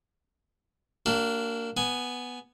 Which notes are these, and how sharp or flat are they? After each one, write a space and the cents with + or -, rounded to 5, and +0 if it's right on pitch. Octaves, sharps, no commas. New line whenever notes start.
A#3 -15 D4 -10 F#4 +45
B3 +0 G#5 +0